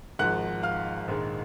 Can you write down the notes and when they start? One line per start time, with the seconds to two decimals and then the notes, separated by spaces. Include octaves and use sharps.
0.19 G#1 G#2 F3 G#3 F#5 F#6
0.63 F5 F6
1.08 A#1 G#2 D#3 G#3